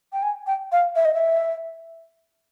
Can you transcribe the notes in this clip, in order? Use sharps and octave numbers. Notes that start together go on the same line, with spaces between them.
G5
G#5
G5
F5
E5
D#5
E5